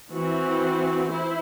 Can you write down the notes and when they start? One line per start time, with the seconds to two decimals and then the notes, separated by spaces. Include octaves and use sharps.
0.15 E3 C4 F#4
1.11 E4 C5